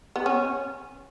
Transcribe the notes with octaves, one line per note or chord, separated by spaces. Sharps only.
B3
C#4